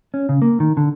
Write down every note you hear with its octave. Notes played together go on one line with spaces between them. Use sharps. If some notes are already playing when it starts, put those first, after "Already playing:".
C#4
C#3
A#3
D#3
D3